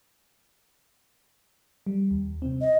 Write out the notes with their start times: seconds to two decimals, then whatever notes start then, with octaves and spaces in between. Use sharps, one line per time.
1.86 G3
2.11 D#2
2.42 C3 C4
2.61 D#5